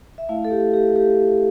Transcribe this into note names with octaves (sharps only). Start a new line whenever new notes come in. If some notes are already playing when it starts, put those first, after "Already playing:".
E5
A3 E4 F5
A4
G4
G4
G4